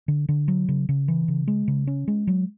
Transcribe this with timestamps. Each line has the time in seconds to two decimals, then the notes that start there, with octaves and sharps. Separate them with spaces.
0.08 D3
0.29 D3
0.48 F#3
0.68 C#3
0.89 C#3
1.08 E3
1.28 C#3
1.48 G#3
1.68 C#3
1.87 C#4
2.08 G#3
2.27 F#3